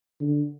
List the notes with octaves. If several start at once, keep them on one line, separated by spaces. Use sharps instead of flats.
D3